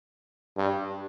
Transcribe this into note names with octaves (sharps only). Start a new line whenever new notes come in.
G2